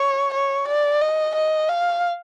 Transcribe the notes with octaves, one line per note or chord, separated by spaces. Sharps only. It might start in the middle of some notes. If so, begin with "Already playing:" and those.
Already playing: C#5
C#5
D5
D#5
D#5
F5